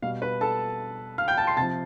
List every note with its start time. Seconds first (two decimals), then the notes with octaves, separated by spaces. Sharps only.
0.02 B2 G3 F5
0.22 B4 B5
0.41 A4 A5
1.18 F5 F6
1.28 G5 G6
1.37 A5 A6
1.47 C6 C7
1.57 C3 F3 A5 A6